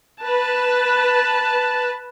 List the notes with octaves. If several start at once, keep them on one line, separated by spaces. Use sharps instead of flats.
B4 A5